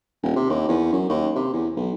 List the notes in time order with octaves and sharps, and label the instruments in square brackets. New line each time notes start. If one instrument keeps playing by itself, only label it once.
[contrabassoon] D#1
C3
D#2
E2
F#2
D#2
C3
E2
B1